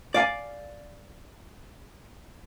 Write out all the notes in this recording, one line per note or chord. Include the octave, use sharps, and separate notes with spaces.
D5 F5 G#5